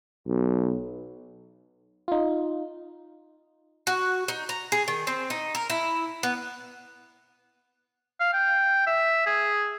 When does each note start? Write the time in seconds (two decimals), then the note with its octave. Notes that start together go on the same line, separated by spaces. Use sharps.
0.27 B1
2.08 D#4 F4
3.87 F#4
4.28 D#4
4.49 A#5
4.72 G#4
4.88 D#3
5.07 C4
5.30 D#4
5.55 A#4
5.70 E4
6.23 B3
8.20 F5
8.33 G5
8.87 E5
9.26 G#4